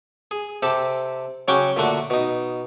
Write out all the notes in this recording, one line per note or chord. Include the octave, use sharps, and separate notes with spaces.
G#4
C3 G4 A4 A5
C#3 F#3 C#4 F#5 G5 D6
A#2 D3 A3 F#4
B2 D#4